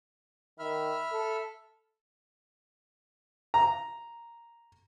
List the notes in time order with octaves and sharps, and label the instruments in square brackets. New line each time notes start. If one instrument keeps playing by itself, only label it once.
[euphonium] D#3 [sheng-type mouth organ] E5 B5 F6
[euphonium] A4
[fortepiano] A#5